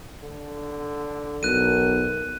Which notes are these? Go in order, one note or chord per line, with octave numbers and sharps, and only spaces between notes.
D3
B1 A#4 F#6 D#7